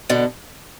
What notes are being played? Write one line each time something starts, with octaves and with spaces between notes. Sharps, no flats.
B2 D3